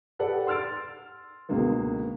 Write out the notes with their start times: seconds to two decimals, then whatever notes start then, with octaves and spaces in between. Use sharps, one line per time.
0.19 G4 A4 B4 D5 F#5
0.47 C6 E6 F6 A6 D7
1.49 C#2 B2 D3 G#3 A#3 B3